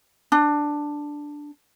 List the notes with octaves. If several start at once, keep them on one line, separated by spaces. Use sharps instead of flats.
D4